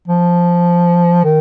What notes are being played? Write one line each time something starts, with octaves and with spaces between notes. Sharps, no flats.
F3
D#3